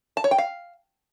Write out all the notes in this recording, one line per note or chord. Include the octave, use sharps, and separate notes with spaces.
A5
C#5
G5
F5